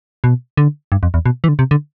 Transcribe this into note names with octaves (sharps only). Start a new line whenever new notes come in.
B2
D3
G2
F2
E2
B2
E3
D3
C3
D3